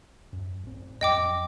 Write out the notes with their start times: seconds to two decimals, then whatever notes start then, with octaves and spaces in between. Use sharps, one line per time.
0.32 F#2
0.64 A1 C4
1.01 F2 F#3 D#5 G5 D6